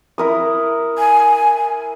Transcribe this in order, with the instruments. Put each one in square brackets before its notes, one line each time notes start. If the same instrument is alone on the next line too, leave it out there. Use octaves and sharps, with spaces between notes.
[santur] E4 A#4 D#6
[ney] G#5